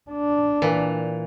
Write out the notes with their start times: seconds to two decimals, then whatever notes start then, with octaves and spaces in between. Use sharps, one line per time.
0.11 D4
0.62 A#2 E3